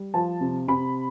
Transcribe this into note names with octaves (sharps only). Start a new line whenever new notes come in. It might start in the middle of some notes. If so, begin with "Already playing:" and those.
Already playing: G3
F3 A5
C3
C3 B5